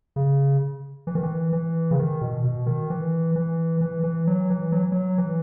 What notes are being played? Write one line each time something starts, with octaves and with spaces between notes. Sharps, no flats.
C#3
E3
D#3
E3
E3
C#3
D#3
B2
B2
D#3
E3
E3
E3
E3
F#3
E3
F#3
F#3
E3